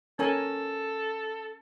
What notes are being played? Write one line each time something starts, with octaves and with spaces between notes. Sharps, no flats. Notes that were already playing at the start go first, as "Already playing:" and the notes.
C#4 A4 A#4 G#5